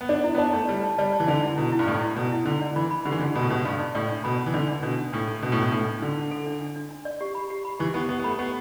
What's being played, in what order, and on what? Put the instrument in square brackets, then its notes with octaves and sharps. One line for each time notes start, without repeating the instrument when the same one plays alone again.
[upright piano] B3
[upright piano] D4 [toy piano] D5
[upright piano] D4 [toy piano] E4
[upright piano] B3
[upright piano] D4 [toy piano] A5
[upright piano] A3 [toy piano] D5
[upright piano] G3 [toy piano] D5
[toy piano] A5
[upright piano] G3 [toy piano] D5
[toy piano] A5
[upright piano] E3
[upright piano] D3 [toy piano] D5
[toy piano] E4
[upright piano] B2 [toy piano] E4
[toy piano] E4
[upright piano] G2
[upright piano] A2 [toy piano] D5
[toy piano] E4
[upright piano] B2 [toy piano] D5
[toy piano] E4
[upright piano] D3 [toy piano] D4
[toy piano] D5
[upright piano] E3 [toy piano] B5
[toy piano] B5
[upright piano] D3 [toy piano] G4
[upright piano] E3
[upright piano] D3 [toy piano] D5
[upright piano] B2 [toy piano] B5
[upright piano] A2
[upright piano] B2 [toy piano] G4
[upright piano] G2 [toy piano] D5
[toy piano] D5
[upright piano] A2 [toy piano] D5
[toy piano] D4
[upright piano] B2 [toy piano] B5
[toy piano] B5
[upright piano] E3
[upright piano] D3 [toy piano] D5
[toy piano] D4
[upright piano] B2 [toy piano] D4
[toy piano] D4
[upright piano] A2 [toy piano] D4
[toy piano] A4
[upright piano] B2 [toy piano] D4
[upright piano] A2
[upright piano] B2 [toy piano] A4
[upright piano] A2 [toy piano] D4
[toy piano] D4
[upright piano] D3 [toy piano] D4
[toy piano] D4
A4
D4
D4
D4
D4
D5
G4
B5
G4
B5
[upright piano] E3 [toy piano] G4
[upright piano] B3 [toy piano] G4
[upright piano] B3 [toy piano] G4
[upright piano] B3
[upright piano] A3 [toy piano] B5
[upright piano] B3 [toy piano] G4